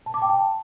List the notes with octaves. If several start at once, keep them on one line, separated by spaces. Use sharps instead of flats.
A5
D6
G5
A5